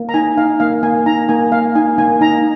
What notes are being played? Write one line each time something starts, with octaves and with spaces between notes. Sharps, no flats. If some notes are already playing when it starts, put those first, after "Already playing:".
Already playing: A#3
A#5
D#4 G#5
D#4 F5
A#3 F5
A#3 G#5
D#4 A#5
A#3 G#5
A#3 F5
D#4 G#5
A#3 G#5
D#4 A#5